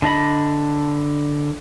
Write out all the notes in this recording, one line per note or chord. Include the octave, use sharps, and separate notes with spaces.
D3 D4 D#5 B5